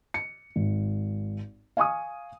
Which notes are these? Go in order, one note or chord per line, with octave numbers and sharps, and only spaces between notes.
C#7
G#1
F5 G#5 C#6 D#6